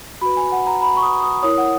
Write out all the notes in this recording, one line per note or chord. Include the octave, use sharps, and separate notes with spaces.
F#4 B4 B5
G#5
F#5
A#5
B5
C#6
D#6
D#6
E4 A#4 C#5 D#6
F#5